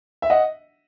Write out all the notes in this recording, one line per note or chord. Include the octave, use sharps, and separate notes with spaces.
E5
D#5 F#5